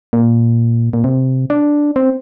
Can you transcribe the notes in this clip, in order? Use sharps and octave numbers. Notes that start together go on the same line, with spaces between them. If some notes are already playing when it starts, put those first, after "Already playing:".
A#2
A#2
C3
D4
C4